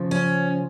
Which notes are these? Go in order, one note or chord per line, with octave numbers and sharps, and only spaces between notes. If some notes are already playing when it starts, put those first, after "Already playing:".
Already playing: C#3 F3
C#4